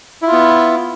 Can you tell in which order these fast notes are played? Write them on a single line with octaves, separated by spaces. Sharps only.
E4 F4 B3